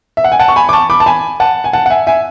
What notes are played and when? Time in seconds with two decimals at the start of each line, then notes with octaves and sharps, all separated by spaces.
0.17 E5
0.24 F#5
0.32 G#5
0.39 F#5 A5
0.48 C#6
0.56 G#5 B5
0.69 D6
0.73 A5 C#6
0.90 B5 D6
1.00 A5
1.06 G#5 B5
1.40 F#5 A5
1.64 G#5
1.73 F#5 A5
1.86 F#5
1.90 E5 G#5
2.07 E5 G#5